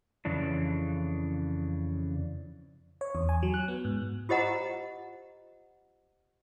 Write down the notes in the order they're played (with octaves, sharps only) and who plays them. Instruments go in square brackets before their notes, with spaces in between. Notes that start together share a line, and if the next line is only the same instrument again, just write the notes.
[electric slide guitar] F2 C#3 E3 D4
[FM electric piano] C#5
E2
G#5
F#3
F#6
B3
G#2
[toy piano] F4 G4 C5 D#5 F#5 A#5